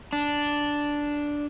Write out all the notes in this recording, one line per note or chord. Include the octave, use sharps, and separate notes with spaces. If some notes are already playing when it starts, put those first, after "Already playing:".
D4